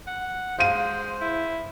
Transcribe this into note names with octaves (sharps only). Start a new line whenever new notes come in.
F#5
G#3 C5 F5 D#7
E4